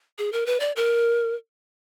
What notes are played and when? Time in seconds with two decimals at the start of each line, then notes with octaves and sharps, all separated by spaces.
0.18 G#4
0.32 A#4
0.46 B4
0.60 D5
0.76 A#4